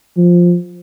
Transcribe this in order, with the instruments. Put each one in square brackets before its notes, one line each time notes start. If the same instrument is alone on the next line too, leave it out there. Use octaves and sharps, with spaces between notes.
[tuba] F3